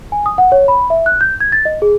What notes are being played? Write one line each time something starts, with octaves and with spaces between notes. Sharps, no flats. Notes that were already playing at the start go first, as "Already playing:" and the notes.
G#5
D#6
F#5
C#5
B5
E5
F#6
G6
G#6
A6
D#5
G#4